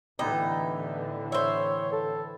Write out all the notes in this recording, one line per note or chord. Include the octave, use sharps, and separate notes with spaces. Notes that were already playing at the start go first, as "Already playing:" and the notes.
A2 D3 E3 B3 D#4 E4 G4
C5 C#5 E5
A4